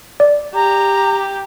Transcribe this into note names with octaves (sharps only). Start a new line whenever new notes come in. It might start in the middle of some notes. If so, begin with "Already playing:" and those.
D5
G4 A#5